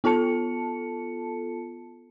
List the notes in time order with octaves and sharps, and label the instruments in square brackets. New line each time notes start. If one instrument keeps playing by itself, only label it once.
[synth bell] B3 F4 A4 A5 C#7